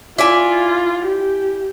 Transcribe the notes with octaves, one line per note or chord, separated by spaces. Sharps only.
E4 F4 D5 G#5
G4